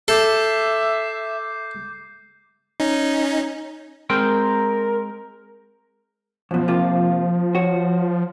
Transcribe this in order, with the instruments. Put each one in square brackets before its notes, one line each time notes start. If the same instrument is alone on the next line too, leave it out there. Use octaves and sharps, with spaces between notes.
[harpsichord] A4 [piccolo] E5 [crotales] D6 G6 C7
[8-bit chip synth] C#4 D#4
[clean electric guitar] G#3 C4 G5 [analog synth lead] A#4
[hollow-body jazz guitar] F#2 B2 [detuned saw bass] F3
[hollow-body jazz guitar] C3 A#3 F4
F#4 C#5